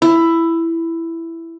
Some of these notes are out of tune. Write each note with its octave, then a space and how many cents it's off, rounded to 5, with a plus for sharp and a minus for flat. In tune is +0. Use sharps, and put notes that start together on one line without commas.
E4 +10